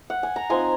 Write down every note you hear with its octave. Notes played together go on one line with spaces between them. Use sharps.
F#5
G#5
A#5
F3 C4 D#4 G#5 C6